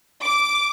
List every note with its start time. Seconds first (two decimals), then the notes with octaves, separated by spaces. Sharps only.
0.24 D6